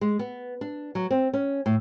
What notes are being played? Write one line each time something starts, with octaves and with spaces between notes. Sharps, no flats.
G#3
B3
D4
F#3
C4
C#4
A2